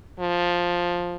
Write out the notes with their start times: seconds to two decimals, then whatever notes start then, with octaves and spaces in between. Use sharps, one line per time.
0.20 F3